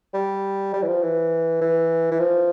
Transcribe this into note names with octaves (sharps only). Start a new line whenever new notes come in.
G3
G3
E3
F3
E3
E3
E3
F3